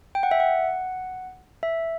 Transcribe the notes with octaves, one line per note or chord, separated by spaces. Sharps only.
G5
F#5
E5
F#5
E5